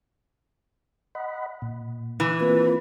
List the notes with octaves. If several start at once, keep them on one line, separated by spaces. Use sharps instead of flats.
D#5 F#5 B5
A#2
E3 D6 F#6
A#3 C4 F4 B4